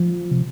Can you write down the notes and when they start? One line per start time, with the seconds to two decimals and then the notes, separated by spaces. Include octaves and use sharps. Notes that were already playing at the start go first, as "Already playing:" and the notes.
Already playing: F3
0.31 C3